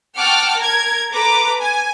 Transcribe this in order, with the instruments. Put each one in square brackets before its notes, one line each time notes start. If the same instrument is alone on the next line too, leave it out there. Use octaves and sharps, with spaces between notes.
[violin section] F#5 G5 A5 C#6 D6 F6
A#4 G#6
A4 B4 A#5 D6
G#5